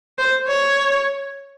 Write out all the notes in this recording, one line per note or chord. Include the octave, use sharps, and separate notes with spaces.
C5
C#5